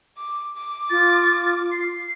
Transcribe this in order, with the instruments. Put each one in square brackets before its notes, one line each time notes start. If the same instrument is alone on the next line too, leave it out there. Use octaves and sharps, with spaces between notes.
[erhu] D6
D6
[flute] F4 [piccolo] A6
[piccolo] C7